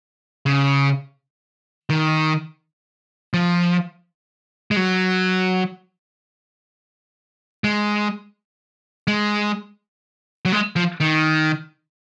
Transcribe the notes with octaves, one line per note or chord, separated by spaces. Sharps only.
C#3
D#3
F3
G#3
F#3
G#3
G#3
F#3
G#3
F3
D#3